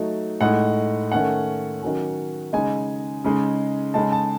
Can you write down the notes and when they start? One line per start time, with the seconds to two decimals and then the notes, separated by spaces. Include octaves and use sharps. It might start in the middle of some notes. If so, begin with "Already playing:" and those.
Already playing: F#3 A3 D#4
0.41 A2 G#3 D#4 F#5
1.12 D#3 A3 C#4 F#5
1.83 D#3 F#3 C#4
2.53 C#3 G#3 D#4 G#5
3.24 C#3 G#3 D#4
3.94 C#3 G#3 D#4 A5
4.12 A5